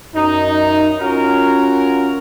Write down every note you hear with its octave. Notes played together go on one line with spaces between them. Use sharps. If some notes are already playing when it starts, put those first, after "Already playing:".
F#2 D#4
C#4 F4 F#4 A#4